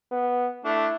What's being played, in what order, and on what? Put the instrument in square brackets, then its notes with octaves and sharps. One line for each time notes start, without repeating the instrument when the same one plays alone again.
[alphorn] B3
[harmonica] A3 D4 [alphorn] E4